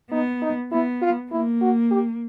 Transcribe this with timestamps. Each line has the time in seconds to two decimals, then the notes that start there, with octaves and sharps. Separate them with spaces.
0.11 B3 D#4
0.42 D#4
0.71 B3 E4
1.02 F4
1.31 A#3 E4
1.61 F#4
1.91 G4